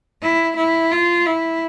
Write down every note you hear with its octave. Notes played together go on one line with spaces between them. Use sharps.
E4
E4
F4
E4